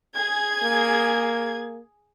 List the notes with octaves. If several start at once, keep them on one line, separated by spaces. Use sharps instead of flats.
G#4 G#6
A#3